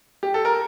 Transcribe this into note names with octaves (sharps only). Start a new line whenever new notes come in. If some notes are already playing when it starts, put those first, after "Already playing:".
G4
A4
A#4